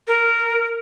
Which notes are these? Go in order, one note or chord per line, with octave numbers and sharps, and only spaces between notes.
A#4